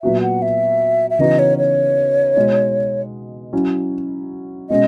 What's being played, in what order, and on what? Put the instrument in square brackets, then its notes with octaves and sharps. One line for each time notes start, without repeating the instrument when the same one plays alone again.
[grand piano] A#2 F#3 B3 F#4 [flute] E5
[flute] F#5
E5
E5
[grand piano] C#3 E3 B3 D#4 F#4 [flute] D#5
[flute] C#5
C#5
[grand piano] B2 G#3 D#4
F#3 C#4 E4
[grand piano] B2 G#3 C#4 [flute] D#5